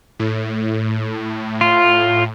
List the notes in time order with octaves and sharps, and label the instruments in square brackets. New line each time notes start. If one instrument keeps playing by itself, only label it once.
[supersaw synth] A2
[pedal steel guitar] F4